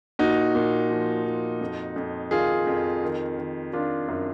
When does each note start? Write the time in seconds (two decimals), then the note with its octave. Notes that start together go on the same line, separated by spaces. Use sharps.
0.19 A#2 D#4 F#4
0.55 A#2
0.90 F3
1.26 F3
1.61 F2
1.96 F2
2.31 D#3 F4 G#4
2.67 F2
3.03 D#3
3.38 D#3
3.73 D#3 D4 F4
4.08 F#2